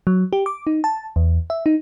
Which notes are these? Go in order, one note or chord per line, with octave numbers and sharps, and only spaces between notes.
F#3
G4
D6
D#4
A5
E2
E5
D#4